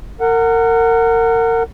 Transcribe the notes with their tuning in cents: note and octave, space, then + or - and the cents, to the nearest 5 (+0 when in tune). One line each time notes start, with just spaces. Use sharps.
A#4 -30 F#5 +0